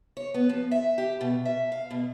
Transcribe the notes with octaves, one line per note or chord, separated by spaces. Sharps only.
C#5
B3
F3
E5
G4
B2
E5
F5
B2